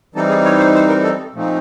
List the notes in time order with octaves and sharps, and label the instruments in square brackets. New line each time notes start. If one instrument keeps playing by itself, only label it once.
[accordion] E3 G3 C4 D#4 A4
G#4
C#5
C5
C5
A#4
A4
A#2 F3 A3 C4 D#4